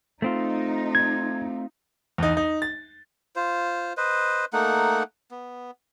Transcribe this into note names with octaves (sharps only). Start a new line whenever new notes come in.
A3 C4 D#4 F4
G#6
E2 D#4
D#4
A6
F4 C5
B4 C5 D#5
A3 A#3 D#4 F#5
B3